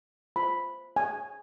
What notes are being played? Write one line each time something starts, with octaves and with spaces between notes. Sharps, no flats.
F4 C5 B5
G#5